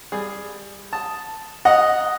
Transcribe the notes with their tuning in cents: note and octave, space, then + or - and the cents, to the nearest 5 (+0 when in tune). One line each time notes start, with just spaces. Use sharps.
G3 +20 G#4 +0
A5 +0 D#6 +0
D#5 +0 F#5 +0 A#5 +0